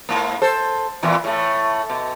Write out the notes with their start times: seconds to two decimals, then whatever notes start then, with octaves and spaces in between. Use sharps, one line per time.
0.09 G#2 A#3
0.42 A4 C5
1.03 E2 A#2 E3
1.24 A2 A3
1.90 B2